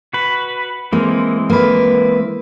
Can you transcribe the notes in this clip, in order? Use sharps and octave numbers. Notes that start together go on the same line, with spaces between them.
F#4 B4
E3 G#3 A#3 C4
A#3 B4